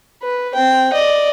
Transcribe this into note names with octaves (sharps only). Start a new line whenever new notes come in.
B4
C4 G5
D5 D#5